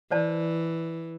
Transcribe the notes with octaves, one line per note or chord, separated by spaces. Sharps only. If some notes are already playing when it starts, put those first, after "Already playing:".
E3 C5 D5 A5